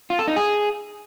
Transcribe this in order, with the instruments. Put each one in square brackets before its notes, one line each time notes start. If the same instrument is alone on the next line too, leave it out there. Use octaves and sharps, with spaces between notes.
[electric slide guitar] F4
A4
D#4
G#4